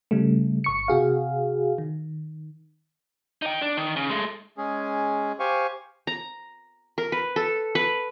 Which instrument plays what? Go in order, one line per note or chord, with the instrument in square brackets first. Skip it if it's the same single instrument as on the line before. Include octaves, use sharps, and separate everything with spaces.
[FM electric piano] C#3 G3 A3
G1 C#6 C#7
C3 F#4 G#4 F5
D#3
[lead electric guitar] D#4 G5
D4
D#3
C#3
G#3 A3
[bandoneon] G#3 C#4 G#4
G4 C5 F5 G#5 C#6
[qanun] A#5
A#4
B4
A4
B4